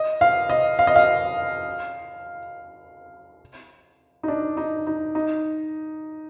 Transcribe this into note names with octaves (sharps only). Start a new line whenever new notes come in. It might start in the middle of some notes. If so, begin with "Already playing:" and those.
Already playing: D#5
F5
D#5
F5
D#5
F5
D#4
D4
D#4
D#4
D#4